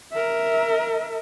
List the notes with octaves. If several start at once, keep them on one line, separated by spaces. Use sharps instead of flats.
A#4 E5